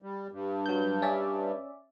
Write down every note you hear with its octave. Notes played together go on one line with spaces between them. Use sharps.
G3
G2
F#3 G6
C#4 D5 E5